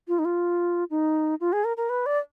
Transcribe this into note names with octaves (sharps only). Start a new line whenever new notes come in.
F4
D#4
F4
D#4
F4
G#4
A#4
A#4
B4
D5